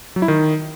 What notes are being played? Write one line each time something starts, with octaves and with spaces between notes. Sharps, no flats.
F#3
E4
D#3